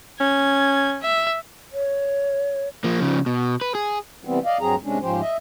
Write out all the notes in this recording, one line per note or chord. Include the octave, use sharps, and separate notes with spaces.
C#4 G#6
E5
C#5
F3 A#3
C#3 F3
B2
B4
G#4
C3 E3 G3 B3 C4
D5 D#5 F5
G2 F#3 C4 G#4 A#5
C3 G#3 C#4 D4
G#2 F3 C#4 G4 C5
D#5 E5